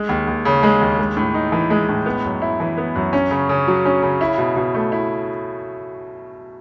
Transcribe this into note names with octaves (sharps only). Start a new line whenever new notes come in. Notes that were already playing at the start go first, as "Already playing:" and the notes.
Already playing: G#3
D#2
D#2
C#3
G#3
D#2
G#3
A2
D#4
E3
G#3
A2
B3
F#2
E4
E3
B3
F#2
C#4
C#3
C#3
F#3
C#4
C#3
E4
B2
B2
A3
E4